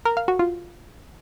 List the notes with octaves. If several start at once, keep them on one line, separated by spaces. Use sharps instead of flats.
A#4
F5
F#4
F4